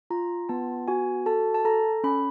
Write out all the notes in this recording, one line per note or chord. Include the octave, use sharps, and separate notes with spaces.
F4 A#5
B3 A5
F#4 G#5
A4 A5
A5
A4 A#5
C#4 B5